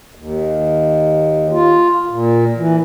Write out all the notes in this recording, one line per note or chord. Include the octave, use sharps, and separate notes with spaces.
D#2
F4
A#2
E3